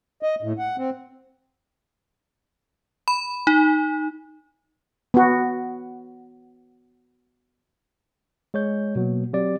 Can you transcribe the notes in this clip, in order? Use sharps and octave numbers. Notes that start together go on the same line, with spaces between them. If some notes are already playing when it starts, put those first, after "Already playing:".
D#5
A2
F#5
C4
B5
D#4
B3 F#4
G#3 C#5 G6
B2 F#3 A#3
F#3 C4 G4 D5